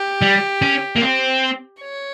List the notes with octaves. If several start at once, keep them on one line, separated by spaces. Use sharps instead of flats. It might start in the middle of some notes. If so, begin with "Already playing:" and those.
Already playing: G4
G3
C#4
A#3
C4
C#5